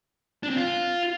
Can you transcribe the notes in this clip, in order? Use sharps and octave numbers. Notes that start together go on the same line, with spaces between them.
D4
C4
F4